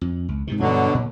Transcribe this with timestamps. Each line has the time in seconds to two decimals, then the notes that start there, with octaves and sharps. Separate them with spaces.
0.01 F2
0.29 C#2
0.47 G#2 C3 D#3
0.60 G2 B2 D3 F#3 D4
0.94 A#2